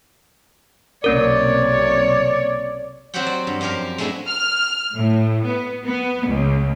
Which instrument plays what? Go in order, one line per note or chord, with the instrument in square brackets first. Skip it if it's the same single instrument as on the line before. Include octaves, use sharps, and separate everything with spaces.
[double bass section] B1 C3 [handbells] A#3 C#4 A#4 [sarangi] C#5 [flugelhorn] D5
[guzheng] F#3 C4 F#4 G4 F#5 G5
D5
G2
F#2 F3 G4 A#4 F5
G#3 A3 C4 D4 E4 F#4
[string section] F6
A2
B3
B3
C#2